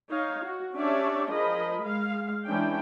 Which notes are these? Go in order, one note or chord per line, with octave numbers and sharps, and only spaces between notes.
D#4 C#5 F5
F#4
C#4 D4 G4 C#5 D5 E5
F3 G#4 A#4 D#5 B5
G#3 F5
E3 G#3 C#4 D4 G5